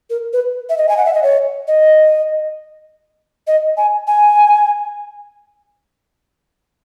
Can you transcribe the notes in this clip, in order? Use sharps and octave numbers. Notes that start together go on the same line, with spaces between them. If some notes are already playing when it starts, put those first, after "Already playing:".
A#4
B4
E5
D#5
G#5
F#5
E5
D#5
C#5
D#5
D#5
G#5
G#5